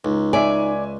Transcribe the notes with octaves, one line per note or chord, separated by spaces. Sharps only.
C#2 D#4
D5 E5 G#5